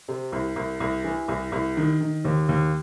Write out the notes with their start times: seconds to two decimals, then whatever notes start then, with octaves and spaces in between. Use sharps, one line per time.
0.08 C3
0.32 C2
0.56 C2
0.80 C2
1.04 E3
1.28 C2
1.52 C2
1.77 D#3
2.01 D#3
2.25 D#2
2.49 D#2